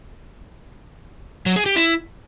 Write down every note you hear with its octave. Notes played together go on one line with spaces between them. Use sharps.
F#3
G#4
G4
E4